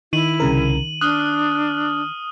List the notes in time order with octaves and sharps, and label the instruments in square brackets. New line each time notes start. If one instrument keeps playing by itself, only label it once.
[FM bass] D#3 [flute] E4 [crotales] D#7 F#7
[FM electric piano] C2 C#3 A#4
[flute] D4 [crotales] D#6 F6 G7 [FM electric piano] F#6